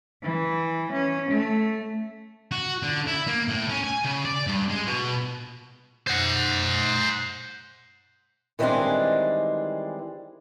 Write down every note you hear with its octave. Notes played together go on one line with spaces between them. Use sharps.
E3
C#4
A3
F#4
D3
E4
A#3
A2
C#4
G#5
C#3
D5
G2
G#3
B2
C5 F#5
D#3 E3 G3 G#3 C4 D4